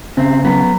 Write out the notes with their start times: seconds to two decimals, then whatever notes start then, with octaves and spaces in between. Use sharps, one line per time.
0.17 C#3 C4
0.44 F#3 B3